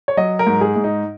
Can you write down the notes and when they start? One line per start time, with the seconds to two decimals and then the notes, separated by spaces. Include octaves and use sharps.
0.08 C#5
0.17 F#3 D#5
0.39 A#4
0.47 G#2
0.61 G#4
0.76 G#2
0.84 D#4